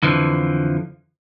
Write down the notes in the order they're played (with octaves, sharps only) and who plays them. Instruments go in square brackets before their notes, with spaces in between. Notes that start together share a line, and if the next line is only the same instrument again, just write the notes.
[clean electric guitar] F2 D3 E3 F3